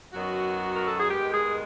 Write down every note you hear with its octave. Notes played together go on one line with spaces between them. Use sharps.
F#2 D#3 F#3 B3 F#4
A#4
A4
G#4
G2 D#3 G#3 B3 G4
G#4